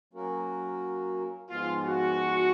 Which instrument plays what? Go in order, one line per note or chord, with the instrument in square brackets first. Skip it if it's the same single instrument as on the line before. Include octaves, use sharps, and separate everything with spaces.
[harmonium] F#3 A#3 C#4 F#4 A#4
[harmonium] G#2 F3 G#3 B3 [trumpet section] F4
[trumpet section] F#4